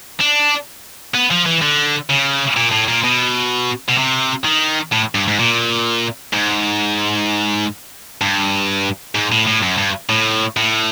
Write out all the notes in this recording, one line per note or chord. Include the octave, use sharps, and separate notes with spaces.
D4
B3
F3
E3
D3
C#3
A#2
A2
A#2
B2
B2
C3
D#3
A2
G2
G#2
A#2
G#2
G2
G#2
A2
A2
F#2
G2
A2
A2